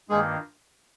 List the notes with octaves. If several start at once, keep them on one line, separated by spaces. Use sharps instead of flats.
G2 D#3 G#3 A#3 F4 G#4